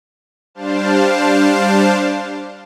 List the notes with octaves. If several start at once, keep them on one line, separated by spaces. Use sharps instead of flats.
G3 D4 C5 F5 A5